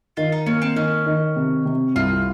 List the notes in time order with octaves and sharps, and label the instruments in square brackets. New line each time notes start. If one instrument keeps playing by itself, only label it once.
[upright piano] D#3 [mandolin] F4
[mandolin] D#4
[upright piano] A#3 [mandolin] C#4
[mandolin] C4
[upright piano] D#3 [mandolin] C#4
[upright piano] D#3
C3
C3
[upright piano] C2 [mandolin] F4